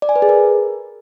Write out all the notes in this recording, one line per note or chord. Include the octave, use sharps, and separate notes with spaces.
D5
G#5
B4
G#4
A#4